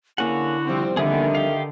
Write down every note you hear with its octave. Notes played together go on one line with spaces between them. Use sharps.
D3 A#3 C#4 E4 F#4 G#4 F#5
C3 F3 G3 C4
D3 D#3 A#3 B3 G#4 E5
G4 F5